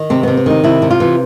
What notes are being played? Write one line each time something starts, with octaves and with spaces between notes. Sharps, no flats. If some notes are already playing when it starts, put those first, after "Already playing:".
Already playing: D#3
C3 C4
C3 B3
B3
D#3 D#4
C3 E4
C3
F4
E3